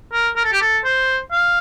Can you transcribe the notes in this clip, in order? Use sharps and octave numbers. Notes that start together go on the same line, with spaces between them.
A#4
A#4
A4
G4
A4
C5
F5